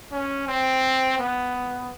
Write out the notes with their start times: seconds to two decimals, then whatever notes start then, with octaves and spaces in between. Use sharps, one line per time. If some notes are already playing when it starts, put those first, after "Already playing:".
0.12 C#4
0.47 C4
1.18 B3